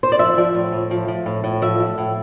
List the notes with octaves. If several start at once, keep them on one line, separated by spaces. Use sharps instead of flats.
C5
D5
F3 E5
F3
A2
A2
F3
F3
A2
A2
F3 E5
F3
A2